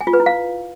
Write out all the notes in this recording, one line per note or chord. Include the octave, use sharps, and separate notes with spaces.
G#5
F4
B4
E4
F5